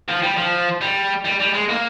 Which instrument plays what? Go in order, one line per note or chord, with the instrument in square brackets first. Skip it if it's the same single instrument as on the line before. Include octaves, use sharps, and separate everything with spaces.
[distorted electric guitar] F3
G3
F3
G3
G3
G3
G#3
A#3